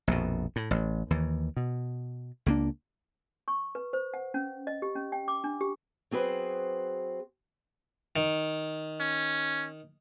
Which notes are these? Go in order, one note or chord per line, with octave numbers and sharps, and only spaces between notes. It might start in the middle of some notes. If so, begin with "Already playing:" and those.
A#1 F2 B2
A2
A1
D#2 E3
B2
C#2 A#3 D4
C#6
B4
C5
F#5
C#4
D#5
G4
C#4
G5
D6
D4
G4
F#3 C4 G#4 B4 C5
D#3
C#4